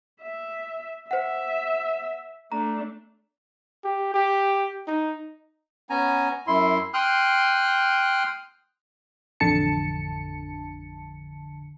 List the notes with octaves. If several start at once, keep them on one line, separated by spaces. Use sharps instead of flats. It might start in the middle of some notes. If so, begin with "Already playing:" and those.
E5
C5 E5 F#5
A3 D4 A#5
G4
G4
D#4
B3 C#4 G#5 A#5
F#2 E4 C6
G5 C6 D#6 F6 F#6
A1 F2 D3 A5 C#7